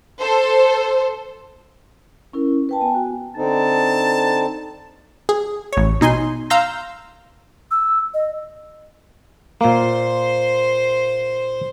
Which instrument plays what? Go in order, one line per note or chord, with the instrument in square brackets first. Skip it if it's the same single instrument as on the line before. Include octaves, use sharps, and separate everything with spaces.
[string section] A4 C5
[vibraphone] C#4 E4 A#4
B4 G5 A5
B3 G5 G#5
F#4
[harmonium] D3 C4 D#4 [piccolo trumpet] A5
[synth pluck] G#4
A1 C#5
B2 D#4 G#5 C6
F5 A#5 C6 E6 G6 A#6
[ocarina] E6
D#5
[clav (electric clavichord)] A#2 A#3 [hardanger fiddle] C5 C6